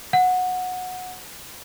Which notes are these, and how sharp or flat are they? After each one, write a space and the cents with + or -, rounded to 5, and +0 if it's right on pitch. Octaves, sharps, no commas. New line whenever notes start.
F#5 -15